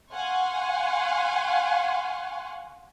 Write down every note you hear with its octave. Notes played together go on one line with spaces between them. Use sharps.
F5 F#5 G#5 C6 C#6